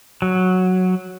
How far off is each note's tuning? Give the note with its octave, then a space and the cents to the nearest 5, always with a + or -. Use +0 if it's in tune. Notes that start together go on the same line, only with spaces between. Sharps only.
F#3 -5